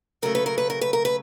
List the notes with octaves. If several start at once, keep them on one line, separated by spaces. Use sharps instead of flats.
C#3 F#3 A3 A#4
B4
A#4
B4
A#4
B4
A#4
B4